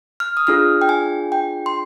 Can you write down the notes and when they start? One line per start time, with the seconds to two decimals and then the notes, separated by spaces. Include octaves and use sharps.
0.20 F6
0.37 D#6
0.47 D4 F4 G#4 F6
0.81 G5
0.89 G#5
1.32 G5
1.66 C6